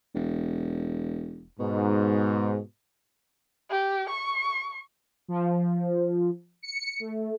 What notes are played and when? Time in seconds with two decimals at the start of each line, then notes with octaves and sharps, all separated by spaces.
0.15 E1
1.60 G#2 B2
3.70 G4
4.10 C#6
5.28 F3
6.62 C#7
7.00 A3